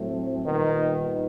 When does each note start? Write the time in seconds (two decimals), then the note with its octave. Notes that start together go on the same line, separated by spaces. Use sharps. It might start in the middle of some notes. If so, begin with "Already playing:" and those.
Already playing: A2 F#3 A3 C4
0.45 A#2 D#3 G3 B3 D#4